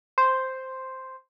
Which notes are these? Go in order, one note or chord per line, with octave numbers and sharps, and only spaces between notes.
C5